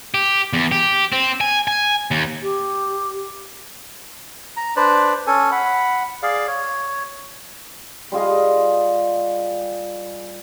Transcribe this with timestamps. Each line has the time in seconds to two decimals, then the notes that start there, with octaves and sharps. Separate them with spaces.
0.14 G4
0.53 E2
0.72 G4
1.12 C4
1.41 G#5
1.68 G#5
2.11 D#2
2.43 G4
4.57 A#5
4.76 D4 B4 C5 D5
5.27 C#4 A4 G#5
5.52 F#5 B5
6.23 G#4 D5 F5
6.47 C#5
8.12 G3 F4 G#4 D#5